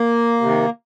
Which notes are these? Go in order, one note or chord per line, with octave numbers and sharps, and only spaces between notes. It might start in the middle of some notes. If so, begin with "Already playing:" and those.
Already playing: A#3
C3 D#3